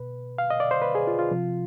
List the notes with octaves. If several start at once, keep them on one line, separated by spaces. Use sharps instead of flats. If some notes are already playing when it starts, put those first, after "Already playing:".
Already playing: B2 B4
F5
D#5
D5
C5
B4
G#4
F4
F4
C3 F3